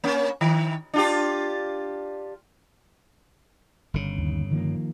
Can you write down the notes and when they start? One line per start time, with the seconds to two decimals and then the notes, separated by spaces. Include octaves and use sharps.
0.04 A#3 C#4
0.41 D#3
0.94 D4 F4 G4
3.94 G1 C#3
4.18 D#2
4.52 D#3 F3 A#3